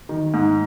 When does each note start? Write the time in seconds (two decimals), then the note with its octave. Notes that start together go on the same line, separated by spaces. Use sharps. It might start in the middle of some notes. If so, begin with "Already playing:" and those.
0.09 D#3
0.34 G#2